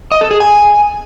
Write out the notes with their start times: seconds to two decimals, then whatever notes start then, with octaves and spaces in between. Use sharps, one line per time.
0.12 D#5
0.21 A4
0.31 G#4
0.40 G#5